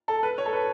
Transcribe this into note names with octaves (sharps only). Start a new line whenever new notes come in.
A4
B4
C#5
A4
B4